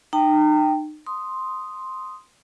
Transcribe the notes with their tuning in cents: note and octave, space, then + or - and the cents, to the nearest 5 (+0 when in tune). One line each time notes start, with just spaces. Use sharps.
D#4 -40 G5 +0 A#5 -40
C6 +0 D#6 +0